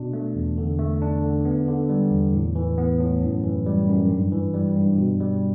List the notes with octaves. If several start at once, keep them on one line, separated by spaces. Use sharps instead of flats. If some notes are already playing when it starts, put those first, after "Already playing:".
Already playing: B2 D4
A3
E2
D3
A3
D4
D3
B3
D3
G3
E2
A2
E3
B3
A2
F#2
E3
G3
F#2
G2
E3
G3
G2
B2
G3